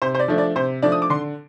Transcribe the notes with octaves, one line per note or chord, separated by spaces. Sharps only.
C3 C5
C5
D5
F3 A3 D4
D5
C3 C5
F3 A3 D4 D5
D#6
D6
D3 C6